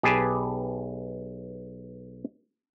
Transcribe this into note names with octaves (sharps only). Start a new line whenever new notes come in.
B1 G4 G#4 B4 G#5 A5